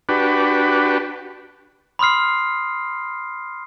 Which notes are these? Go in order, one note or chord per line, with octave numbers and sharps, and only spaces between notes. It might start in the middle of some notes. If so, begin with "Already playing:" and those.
D4 F#4 G4 B4
B5 C6 D#6 F6 C7